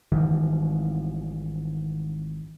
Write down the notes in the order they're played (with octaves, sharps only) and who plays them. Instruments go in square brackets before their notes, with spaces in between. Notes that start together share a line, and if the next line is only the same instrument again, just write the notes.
[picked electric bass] G#1 D#3 E3 G3